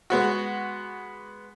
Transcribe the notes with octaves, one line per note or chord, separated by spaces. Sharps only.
G#3 B3 F#4